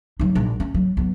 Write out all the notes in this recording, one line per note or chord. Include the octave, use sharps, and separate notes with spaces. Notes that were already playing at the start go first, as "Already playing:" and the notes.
F#3 D#4
A#1
C#4
F#3
F#3 B3